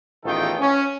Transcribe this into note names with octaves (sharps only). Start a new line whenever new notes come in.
A1 E2 D#3 F4 A4 G5
C#4